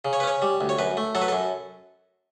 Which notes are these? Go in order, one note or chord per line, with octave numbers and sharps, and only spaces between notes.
C#3
C#5
B4
C#4 C#5
G3
D2
C#5
F#2 B4
A3
F#3 A4
B4
F#2 A4